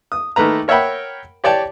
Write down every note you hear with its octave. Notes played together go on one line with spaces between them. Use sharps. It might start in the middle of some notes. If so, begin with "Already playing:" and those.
D#6
D#3 A3 A#3 B4 A#5
A#4 C#5 E5 F#5 G5 B5
G4 C#5 D5 G5 A5